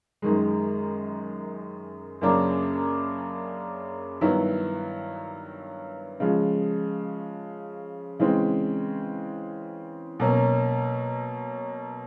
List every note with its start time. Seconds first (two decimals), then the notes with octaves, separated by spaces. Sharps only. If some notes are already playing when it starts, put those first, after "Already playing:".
0.22 F#2 D#3 G#3
2.21 F#2 C#3 F#3 A#3 D4
4.21 G2 D#3 F#3 B3 E4
6.20 C#3 F3 G#3
8.19 C#3 E3 G#3 C4
10.20 B2 F#3 A#3 C#4